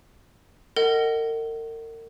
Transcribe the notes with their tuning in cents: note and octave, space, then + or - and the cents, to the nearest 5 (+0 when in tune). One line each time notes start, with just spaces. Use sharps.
A#4 -40 D#5 +0 F#5 +30